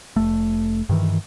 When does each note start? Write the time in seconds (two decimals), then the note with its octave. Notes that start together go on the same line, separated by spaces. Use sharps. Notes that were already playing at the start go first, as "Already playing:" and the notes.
0.16 F1 A3
0.89 G2 D#3 E3